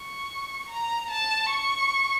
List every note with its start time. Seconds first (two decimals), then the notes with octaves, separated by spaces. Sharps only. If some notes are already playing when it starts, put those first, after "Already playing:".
Already playing: C#6
0.69 A#5
1.10 A5
1.50 C#6